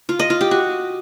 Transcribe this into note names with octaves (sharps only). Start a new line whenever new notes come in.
F4
D#5
F4
G4
F#4